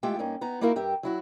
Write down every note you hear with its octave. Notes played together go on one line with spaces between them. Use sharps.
G#3 A3 E4 F4 G4 G5
G2 A#3 C#4 D#4
B3 D#4 A#5
A#3 D#4 E4 F#4 A#4 F5
G2 G4 A#4 E5
F#3 E4 F#4